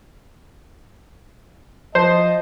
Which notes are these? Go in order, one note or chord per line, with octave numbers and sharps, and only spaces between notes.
F3 C5 D#5 A5